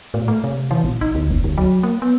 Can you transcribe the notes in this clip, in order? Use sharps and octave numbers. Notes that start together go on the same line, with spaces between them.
A2
A3
C3
E3
A#1
D#4
D2
F#1
D2
F#3
A#3
B3